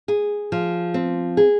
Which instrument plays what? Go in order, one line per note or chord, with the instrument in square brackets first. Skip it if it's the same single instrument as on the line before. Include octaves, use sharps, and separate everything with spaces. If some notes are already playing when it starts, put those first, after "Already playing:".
[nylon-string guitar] G#4
F3
C4
G#4